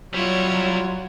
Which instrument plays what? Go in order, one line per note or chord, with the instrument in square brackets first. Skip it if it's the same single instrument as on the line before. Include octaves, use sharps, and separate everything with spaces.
[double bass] F#3 [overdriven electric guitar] G3 E4 [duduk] F4 [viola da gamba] C#5